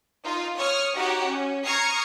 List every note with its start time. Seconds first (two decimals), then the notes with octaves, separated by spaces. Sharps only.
0.22 D#4 F4
0.56 C#5 C#6 D#6 F6
0.95 D#4 F#4 G4 C#5 F#5
1.25 C#4
1.64 A#5 C#6 D#6 F6 G#6 C7